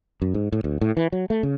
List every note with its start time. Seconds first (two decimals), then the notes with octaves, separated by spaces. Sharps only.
0.22 F#2
0.34 G#2
0.52 A2
0.64 D2
0.81 A2
0.97 E3
1.12 F#3
1.30 A3
1.43 C#3